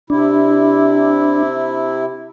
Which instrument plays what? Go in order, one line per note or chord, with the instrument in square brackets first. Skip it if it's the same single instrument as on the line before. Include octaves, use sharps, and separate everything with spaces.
[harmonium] C3 E4 [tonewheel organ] D4